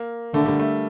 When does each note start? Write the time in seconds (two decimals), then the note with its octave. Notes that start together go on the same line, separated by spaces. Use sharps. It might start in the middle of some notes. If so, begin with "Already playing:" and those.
Already playing: A#3
0.34 D3 A3
0.46 G3
0.60 A3